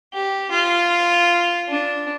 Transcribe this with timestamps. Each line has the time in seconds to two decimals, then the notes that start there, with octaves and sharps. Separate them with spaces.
0.13 G4
0.52 F4
1.69 D4